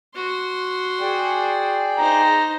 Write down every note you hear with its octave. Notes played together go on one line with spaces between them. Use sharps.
F#4 C6
G#4 D5 G5
D#4 C5 A#5